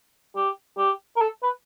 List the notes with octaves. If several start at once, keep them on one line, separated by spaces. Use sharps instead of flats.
G4
G4
A#4
A4
B4